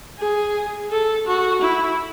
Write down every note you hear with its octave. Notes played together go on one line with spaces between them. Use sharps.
G#4
A4
F#4
E4